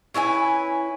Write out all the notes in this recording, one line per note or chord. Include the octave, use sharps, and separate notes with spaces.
C#4 E4 B4 G#5